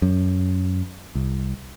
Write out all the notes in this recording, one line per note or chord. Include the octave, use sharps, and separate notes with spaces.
F#2
C2